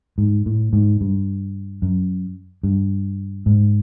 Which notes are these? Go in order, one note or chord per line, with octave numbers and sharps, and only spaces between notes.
G#2
A2
G#2
G2
F#2
G2
G#2